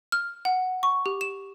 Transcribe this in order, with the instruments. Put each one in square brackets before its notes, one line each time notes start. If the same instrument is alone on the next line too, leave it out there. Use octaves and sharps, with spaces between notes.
[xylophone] F6
F#5
C#6
G4
E7